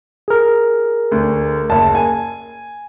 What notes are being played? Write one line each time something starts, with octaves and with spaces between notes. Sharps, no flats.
G#4 A#4
D2
F#1 A5
G#5